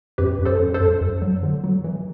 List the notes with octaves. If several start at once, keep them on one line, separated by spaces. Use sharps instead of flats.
F#2 G4 B4
F#2
A4 C5
F#2
A4 C5
F#2
F#2
F#3
D3
F#3
E3